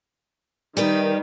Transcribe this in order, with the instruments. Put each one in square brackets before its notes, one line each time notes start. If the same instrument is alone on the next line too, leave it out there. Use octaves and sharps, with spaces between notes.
[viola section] D#3 [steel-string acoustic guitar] G3 G4 B4